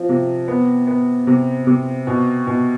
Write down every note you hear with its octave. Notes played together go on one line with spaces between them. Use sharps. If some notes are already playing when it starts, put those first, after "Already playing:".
Already playing: F3 C4
C3
B3
B3
C3
C3
B2
B2